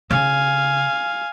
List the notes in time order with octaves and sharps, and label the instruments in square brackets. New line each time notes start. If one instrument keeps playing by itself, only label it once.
[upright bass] C#3 [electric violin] F5 G#5